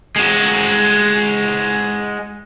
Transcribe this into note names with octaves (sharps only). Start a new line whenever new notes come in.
G#3 F#4